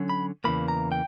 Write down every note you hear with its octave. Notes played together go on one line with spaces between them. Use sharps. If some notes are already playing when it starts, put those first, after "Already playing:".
Already playing: D3 F#3 C#4
B5
E2 C#3 E3 A#3 B5
A#5
G5